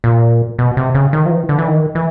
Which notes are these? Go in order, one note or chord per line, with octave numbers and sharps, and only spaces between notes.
A#2
B2
C3
C#3
D#3
F3
E3
D3
E3
D#3
E3